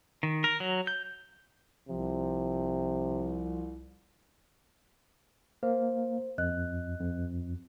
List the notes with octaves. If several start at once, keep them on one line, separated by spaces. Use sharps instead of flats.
D#3
A#4
F#3
G6
C2 C3 F3
A#3 C5
F2 D#5 F#6
F2